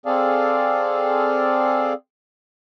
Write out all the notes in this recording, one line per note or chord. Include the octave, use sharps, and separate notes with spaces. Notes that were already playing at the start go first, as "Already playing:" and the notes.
C4 G#4 A4 D5 F5